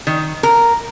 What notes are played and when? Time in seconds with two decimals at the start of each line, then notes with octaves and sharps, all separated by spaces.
0.07 D#3
0.43 A#4